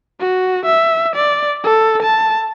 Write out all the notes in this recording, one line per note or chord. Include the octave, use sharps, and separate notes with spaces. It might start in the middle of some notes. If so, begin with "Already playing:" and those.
F#4
E5
D5
A4
A5